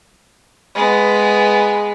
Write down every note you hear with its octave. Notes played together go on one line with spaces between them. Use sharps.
G#3 B3